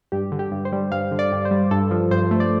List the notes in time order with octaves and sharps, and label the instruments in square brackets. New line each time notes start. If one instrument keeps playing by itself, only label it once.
[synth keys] G2 G4
D3
G4
G2
C5
G3
G2 F5
D3
D5
G2
C5
G3
G2 A4
F3
G2 C5
A3
D5